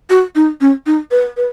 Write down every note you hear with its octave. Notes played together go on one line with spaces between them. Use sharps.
F#4
D#4
C#4
D#4
B4
B4